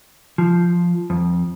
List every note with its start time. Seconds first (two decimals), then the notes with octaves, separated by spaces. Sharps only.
0.38 F3
1.10 F2